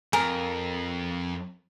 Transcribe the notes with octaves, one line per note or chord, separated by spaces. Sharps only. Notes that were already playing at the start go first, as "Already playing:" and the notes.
F2 A#4 G#5